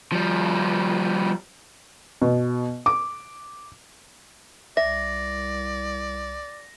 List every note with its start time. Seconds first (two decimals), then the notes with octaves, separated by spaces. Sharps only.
0.12 F3 G3
2.22 B2
2.86 D6
4.77 C2 D5 E5 A#6